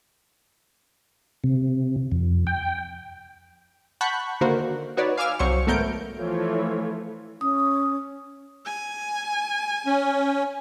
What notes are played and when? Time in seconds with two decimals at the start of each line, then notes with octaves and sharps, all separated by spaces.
1.44 C3
2.12 F2
2.47 G5
4.01 F#5 A5 B5 C#6 F#6 G6
4.41 D3 D#3 A#3 F#4 A#4 C5
4.97 D#4 F#4 B4 C#5 D5
5.17 F5 G#5 D6 E6 F6
5.39 C2 F#3 C5 C#6 C#7
5.67 G#1 A3 B3 A#4 G6 D7
6.17 E3 F3 A3 F4 C#5
7.41 C#4 D#6
8.66 G#5
9.86 C#4